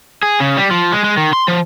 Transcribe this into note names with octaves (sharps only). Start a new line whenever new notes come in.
G#4
C#3
G3
F3
G#3
G#3
D#3
C6
F3